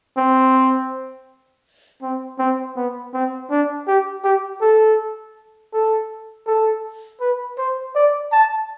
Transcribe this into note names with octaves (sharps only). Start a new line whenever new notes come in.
C4
C4
C4
B3
C4
D4
G4
G4
A4
A4
A4
B4
C5
D5
A5